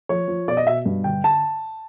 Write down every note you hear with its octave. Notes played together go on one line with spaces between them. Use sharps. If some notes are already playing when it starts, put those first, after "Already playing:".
F3 C#5
F3
B2 D5
D#5
B2 E5
G2
D3 G5
A5